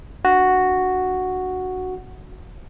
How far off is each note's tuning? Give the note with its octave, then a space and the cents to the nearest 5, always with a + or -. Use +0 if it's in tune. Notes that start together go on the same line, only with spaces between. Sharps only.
D4 +0 F#4 +0